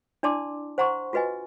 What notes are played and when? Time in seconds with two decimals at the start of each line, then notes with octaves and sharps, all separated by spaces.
0.23 D4 E4 D5 A5 C6 D6
0.78 C5 F#5 A#5 C6 C#6
1.13 F4 F#4 B4 D#5 G#5